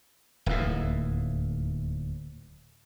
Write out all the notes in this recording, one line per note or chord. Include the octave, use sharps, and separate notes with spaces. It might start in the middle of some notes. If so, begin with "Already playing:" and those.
D1 D#2 A2